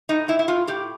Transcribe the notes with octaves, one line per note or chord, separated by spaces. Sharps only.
A2 D#4
A2 E4
E4
A2 F4
A2 G4